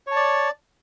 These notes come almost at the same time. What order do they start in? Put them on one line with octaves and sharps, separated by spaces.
C#5 A5 D5